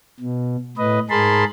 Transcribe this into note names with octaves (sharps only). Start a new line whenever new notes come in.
B2
A2 B4 D#5
G#2 G#4 A#4 A5 B5 C6